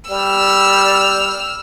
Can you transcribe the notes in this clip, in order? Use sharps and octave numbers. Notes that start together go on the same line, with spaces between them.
G3 E6 F6